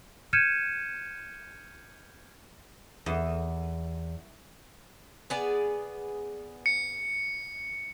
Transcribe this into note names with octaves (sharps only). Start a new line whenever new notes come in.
F6 G6 G#6 C#7 D#7 E7
E2
B3 G#4 D5
C#7